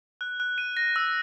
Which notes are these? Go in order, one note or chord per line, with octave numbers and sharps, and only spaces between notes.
F#6
F#6
D#7
A#6
E6